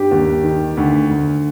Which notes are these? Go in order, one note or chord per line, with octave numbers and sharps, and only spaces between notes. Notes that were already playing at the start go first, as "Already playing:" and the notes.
Already playing: G2 G4
D#2
D#3
D2
D2